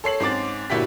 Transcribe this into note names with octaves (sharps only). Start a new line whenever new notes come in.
A4 C#5 C7 F#7
G#2 C4 C#4 D6 A6
G1 A#2 E4 F#4 G4 B6